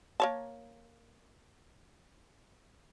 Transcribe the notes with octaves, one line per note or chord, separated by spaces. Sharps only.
A#3 C#5 A5